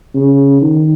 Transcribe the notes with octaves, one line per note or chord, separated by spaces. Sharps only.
C#3
D#3